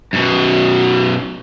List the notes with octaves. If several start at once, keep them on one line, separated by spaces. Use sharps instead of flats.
F#2 B2